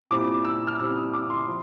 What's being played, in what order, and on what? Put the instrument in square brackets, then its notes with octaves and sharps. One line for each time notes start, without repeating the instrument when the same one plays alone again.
[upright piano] A#2 G3 C4 E4 D6
E6
F6
A#2 G3 C4 E4 E6
D#6
D6
C6
F3